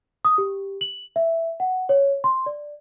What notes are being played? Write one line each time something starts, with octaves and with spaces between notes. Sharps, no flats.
D#6
G4
F#7
E5
F#5
C#5
C6
D5